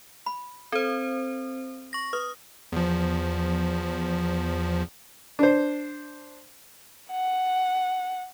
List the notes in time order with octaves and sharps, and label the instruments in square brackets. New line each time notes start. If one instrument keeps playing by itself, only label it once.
[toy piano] B5
[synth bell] C4 C5 [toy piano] A4
[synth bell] C#6 A#6
[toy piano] B4 [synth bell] D#6
[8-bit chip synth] E2 F3
[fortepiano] D4 C5
[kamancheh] F#5